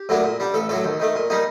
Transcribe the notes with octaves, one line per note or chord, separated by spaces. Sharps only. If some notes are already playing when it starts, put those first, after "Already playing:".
Already playing: G4
A2 F#3 A#3 D4
A#2
G3 D4
A1 A4
A2 F#3 A4
D#2
D#3 A3
A#2
G3 A#3 D#4